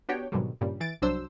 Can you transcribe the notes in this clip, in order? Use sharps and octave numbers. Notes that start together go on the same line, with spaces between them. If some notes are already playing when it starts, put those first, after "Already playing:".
B3 D4 F#4 G4 C#5 G5
G#2 B2 D3 D#3 F#3 G3
G2 A#2 C#3 G3
E3 A6 D7
C2 G2 F#3 D4 C5 E6